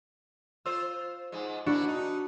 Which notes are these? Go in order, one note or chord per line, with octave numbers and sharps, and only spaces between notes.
F4 C5 E6
G#2 G#3
A#3 D4 E4 F#4
D#4